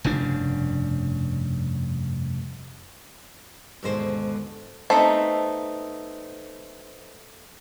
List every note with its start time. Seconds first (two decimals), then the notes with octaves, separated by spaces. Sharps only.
0.04 F1 G2 C#3 D4
3.83 D#2 G#2 B2 D3 G#3 C5
4.90 A3 B3 C4 D#4 C5